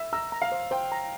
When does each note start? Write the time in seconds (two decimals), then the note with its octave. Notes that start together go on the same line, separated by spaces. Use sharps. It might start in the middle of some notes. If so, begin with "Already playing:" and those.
Already playing: E5
0.13 A#5 E6
0.32 A#5
0.42 F5
0.52 C5
0.71 C5 G5
0.92 A#5